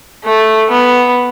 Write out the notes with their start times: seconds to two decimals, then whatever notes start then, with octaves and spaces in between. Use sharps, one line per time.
0.24 A3
0.70 B3